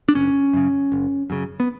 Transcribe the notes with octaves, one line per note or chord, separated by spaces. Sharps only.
D4
F#1 C#4
F#2 C#3
F#1
F#2 C#3
B3